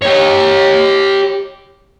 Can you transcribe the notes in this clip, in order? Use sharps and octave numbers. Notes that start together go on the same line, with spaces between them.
G4 C#5